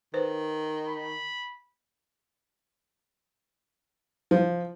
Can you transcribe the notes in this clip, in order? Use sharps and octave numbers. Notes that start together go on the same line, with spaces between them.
D#3 B4 C5
B5
F3